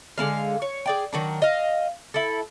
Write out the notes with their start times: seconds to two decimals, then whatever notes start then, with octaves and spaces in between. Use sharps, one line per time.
0.18 D3 G#3 C4 F5
0.62 C#5
0.86 G#4 D5 G5
1.13 D#3 F#3 D4
1.42 D#5 F5
2.14 E4 A4